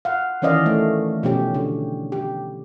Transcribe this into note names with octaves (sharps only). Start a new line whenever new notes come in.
F5 F#5
D#3 E3 C#4 D5 D#5 F5
A3
B2 F3 C#4 G4
D3
G4